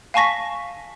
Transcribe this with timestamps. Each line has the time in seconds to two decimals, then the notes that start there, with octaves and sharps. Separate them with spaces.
0.14 F5 G#5 A5 C#6 A#6 B6